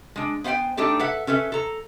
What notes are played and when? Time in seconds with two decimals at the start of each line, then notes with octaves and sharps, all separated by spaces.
0.16 G#3 D4
0.44 B3 C5 F5 G5 G#5
0.77 A3 D4 D#4 G4 A4
0.99 A4 B4 E5 F#5
1.27 C#4 A4 B4 E5
1.52 A4 A#5